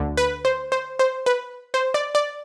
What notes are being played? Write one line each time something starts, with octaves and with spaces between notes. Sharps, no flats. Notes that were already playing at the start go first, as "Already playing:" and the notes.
Already playing: D2 D3
B4
C5
C5
C5
B4
C5
D5
D5